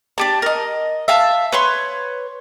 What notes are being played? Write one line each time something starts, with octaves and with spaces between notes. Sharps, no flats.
D4 G4 A5
A#4 D#5
E5 F5 A5
B4 C#5 C6